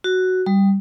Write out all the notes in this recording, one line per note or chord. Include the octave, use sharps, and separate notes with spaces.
F#4
G3